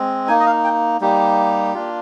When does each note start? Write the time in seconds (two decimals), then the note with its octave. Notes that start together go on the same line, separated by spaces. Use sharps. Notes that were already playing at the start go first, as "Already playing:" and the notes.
Already playing: G#3 C4
0.28 A#3 D#4 G#5
0.40 D#5
0.46 F5
0.64 G5
1.01 G3 A#3 D#4 G4
1.74 A#3 D4 F4